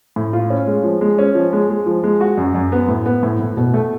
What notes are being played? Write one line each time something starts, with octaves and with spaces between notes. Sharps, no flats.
A2
F4
C#4
G#3
F3
G#3
C#4
F3
G#3
G#3
F3
G#3
F#4
F#2
F#2
B3
A2
B3
A2
A2
B2
A3